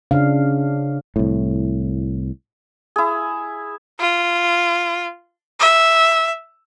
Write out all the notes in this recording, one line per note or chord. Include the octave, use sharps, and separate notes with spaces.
C#3 D4 F5
C2 A2
E4 G#4
F4
E5